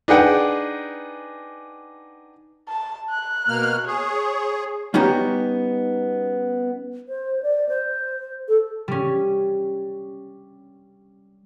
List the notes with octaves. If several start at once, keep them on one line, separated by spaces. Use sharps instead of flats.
D4 D#4 G#4 B4 F#5 G5
A5
F#6
B2 A#3 F6
G#4 C#5
G3 B3 C#4 D#4 F#4 G4
C5
D5
C5
A4
G3 C#4